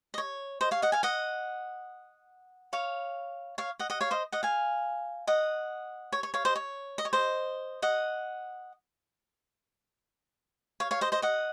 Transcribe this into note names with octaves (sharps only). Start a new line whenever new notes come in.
D#5
C#5
C5 D#5
C#5 F5
D#5 F#5
F5 G#5
D#5 F#5
C#5 F5
C#5 F5
D#5 F#5
D#5 F#5
C#5 F5
C5 D#5
D#5 F#5
F5 G#5
D#5 F#5
C#5
C#5
C#5 F5
C5 D#5
C#5
D#5
C#5
C5 D#5
D#5 F#5
C#5 F5
C#5 F5
C5 D#5
C5 D#5
D#5 F#5